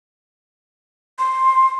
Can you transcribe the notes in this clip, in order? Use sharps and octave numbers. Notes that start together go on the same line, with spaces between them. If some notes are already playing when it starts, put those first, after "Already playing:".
C6